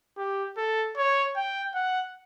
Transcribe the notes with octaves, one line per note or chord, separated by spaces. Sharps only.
G4
A4
C#5
G5
F#5